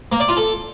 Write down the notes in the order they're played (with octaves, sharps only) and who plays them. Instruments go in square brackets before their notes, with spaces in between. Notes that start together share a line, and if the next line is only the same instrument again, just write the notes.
[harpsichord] A#3
D5
F4
A4